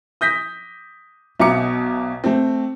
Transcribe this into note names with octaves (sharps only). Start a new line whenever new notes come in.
D#6 G6 A#6 B6
B1 B2 E5 A#5 D6 C#7
A3 C4